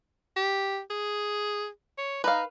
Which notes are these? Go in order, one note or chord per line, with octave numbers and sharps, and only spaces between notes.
G4
G#4
C#5
D#4 B4 F5